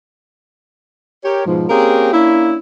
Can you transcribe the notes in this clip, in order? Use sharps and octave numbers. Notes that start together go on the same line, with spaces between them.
G4 A#4 C#5
G#2 B2 F3
A#3 C4 C#4 G4 G#4 A#4
A#3 C#4 D4 E4